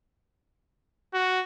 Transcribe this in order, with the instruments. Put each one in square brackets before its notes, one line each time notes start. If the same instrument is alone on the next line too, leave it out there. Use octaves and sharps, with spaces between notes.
[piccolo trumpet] F#4